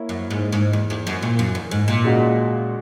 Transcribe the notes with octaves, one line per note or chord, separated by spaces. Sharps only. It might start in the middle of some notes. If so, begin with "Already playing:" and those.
Already playing: A#3 E4 C#5
F#2
G#2
G#2
E2
E2
F#2
A#2
F#2
E2
G#2
A#2
C#3 G#3 D#4 F#4